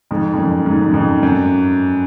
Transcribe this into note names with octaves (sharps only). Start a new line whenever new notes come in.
F2 G#2
F2
F#2
G#2
F#2
F2 G#2
F#2